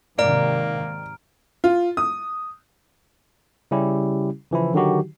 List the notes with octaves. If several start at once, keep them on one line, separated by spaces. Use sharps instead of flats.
G#2 C3 D#3 A#3 D5 A#5 F6 D7
F4
D#6
C#3 G3 C#4 E4 G4
C#3 E3 F3 E4
D3 D#3 F#3 D#4 F#4 G4